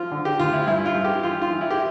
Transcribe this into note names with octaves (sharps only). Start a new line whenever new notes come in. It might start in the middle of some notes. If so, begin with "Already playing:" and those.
Already playing: F3 F4
D3
G4
D2 F4
E4
G2 E4
F4
G2
G4
E3 F4
F4
E3
E4
G4